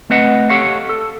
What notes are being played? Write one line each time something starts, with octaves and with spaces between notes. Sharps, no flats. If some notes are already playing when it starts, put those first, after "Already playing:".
A3 C4 B4 D#5 F#5
G4 A4 C#5 F5 F#5
A4